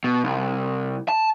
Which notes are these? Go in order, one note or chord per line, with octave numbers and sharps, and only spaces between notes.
B2
C2
A5